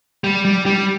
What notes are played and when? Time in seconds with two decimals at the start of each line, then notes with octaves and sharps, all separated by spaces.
0.24 G3
0.45 G3
0.66 G3